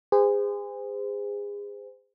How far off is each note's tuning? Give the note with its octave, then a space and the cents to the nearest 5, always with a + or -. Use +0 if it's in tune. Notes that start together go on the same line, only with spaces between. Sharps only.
G#4 -30 C5 -35